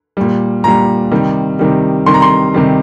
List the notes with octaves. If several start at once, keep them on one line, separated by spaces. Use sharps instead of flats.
A#2 G3
A#2 G3 A#5
C3 D#3 G3
C3 D#3 G3
C3 D#3 G3 C6
A#5
C6
C3 D#3 G3